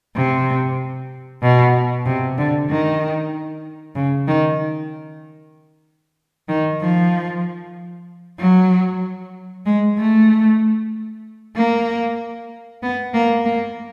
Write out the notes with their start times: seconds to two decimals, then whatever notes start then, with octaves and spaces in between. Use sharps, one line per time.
0.16 C3
1.43 B2
2.06 C3
2.38 D3
2.70 D#3
3.95 C#3
4.28 D#3
6.48 D#3
6.81 F3
8.40 F#3
9.66 G#3
9.97 A3
11.56 A#3
12.83 B3
13.14 A#3
13.45 A#3